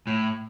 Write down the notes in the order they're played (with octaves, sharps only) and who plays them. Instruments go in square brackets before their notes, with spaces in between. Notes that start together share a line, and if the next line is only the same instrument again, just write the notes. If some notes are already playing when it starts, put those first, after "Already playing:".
[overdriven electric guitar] A2